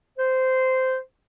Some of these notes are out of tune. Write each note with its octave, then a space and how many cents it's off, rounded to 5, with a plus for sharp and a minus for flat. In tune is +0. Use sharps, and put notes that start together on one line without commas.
C5 -15